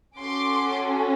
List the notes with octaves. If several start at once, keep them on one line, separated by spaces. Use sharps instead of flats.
C#4 F#4 A4 C6 D6